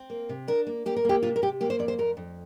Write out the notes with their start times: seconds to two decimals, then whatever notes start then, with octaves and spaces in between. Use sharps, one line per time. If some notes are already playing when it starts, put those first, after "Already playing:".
Already playing: C4
0.10 A#3
0.29 C3
0.48 D4 A#4
0.67 A#3
0.86 A#3 G4
0.96 A#4
1.05 A#3 G4
1.22 C3 F4
1.36 A#4
1.42 C3 G4
1.61 A#3 G4
1.70 C5
1.79 F2 D5
1.88 C5
1.98 F2 A#4
2.17 F2